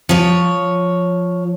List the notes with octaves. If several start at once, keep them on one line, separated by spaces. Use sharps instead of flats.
F3 C#5